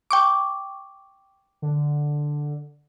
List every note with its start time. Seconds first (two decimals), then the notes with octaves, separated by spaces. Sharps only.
0.11 G5 C#6 D6
1.62 D3